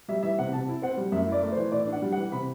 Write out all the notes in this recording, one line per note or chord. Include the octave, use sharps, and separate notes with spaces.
G3 E5
E3 E5
C3 F#5
C3 A5
E4
C4 F#5
G3
F#2 E5
E4 D5
A3
C5
E3
A2 D5
D4
F#5
G3
E3 F#5
C3 B5